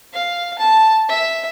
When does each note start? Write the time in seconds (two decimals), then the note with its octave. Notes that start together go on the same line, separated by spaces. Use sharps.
0.13 F5
0.58 A5
1.09 E5